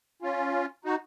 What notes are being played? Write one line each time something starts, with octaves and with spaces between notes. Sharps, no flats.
C#4 F4
D#4 F#4